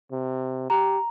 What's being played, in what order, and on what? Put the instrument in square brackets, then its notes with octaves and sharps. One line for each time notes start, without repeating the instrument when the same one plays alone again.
[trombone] C3
[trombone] G4 [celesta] A#5